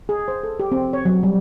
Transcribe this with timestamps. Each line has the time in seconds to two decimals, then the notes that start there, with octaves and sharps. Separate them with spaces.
0.09 G#4
0.28 C5
0.43 A4
0.60 G4
0.72 C4
0.93 C#5
1.05 F#3
1.23 G3